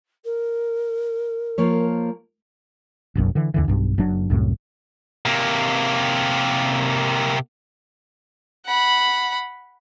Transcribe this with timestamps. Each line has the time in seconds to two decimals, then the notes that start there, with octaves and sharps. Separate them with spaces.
0.24 A#4
1.58 F3 A#3 C#5
3.15 F#1 B1 F#2
3.35 D3 E3
3.54 D#2 D3 E3
3.68 B1 G2
3.98 F#1 F#2 F#3 D4
4.30 C2 F#2 A2
5.26 C3 A#3
8.66 F#5 B5